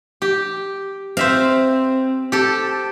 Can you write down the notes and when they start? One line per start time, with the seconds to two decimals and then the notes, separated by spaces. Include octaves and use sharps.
0.22 G4
1.17 C4 C5 E5 F5
2.32 G4 A4